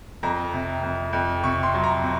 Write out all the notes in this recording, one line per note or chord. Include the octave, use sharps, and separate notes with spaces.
F2 A#5
C3
F2
F2
C3 C#6
C6
F#3
A#5
C3